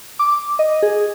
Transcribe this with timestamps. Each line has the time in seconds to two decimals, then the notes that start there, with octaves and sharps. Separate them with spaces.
0.19 D6
0.59 D#5
0.83 G#4